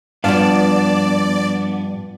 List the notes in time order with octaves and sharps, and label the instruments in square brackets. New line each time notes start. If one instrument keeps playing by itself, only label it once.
[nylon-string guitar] G2 [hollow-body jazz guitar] F3 F5 [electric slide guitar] B3 D4 [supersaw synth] D5